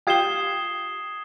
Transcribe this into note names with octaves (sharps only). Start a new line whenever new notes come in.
F4 G4 D#6 G#6 C7 E7 G7